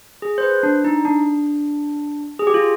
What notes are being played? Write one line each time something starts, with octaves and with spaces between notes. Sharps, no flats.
G#4
C5
B4
D4
D#4
D4
G#4
G4
F4